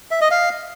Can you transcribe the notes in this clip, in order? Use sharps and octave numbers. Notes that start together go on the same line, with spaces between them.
E5
D#5
F5